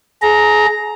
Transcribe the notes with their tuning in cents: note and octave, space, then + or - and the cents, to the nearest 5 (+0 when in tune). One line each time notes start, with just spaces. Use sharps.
G#4 +30 A#5 +0